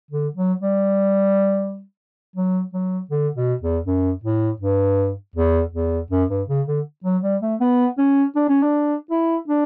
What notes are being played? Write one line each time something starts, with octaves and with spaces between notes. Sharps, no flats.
D3
F#3
G3
F#3
F#3
D3
B2
E2
F#2
A2
G2
E2
E2
F#2
G2
C#3
D3
F#3
G3
A3
B3
C#4
D4
C#4
D4
E4
D4